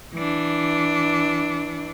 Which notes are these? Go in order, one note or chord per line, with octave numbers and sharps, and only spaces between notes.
E3 D4